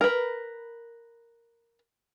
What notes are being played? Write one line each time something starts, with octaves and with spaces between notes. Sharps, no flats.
A#4 B4